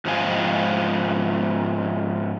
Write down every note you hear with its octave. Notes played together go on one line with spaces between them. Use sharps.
G#2 F3 G#3 C4 G#4 F5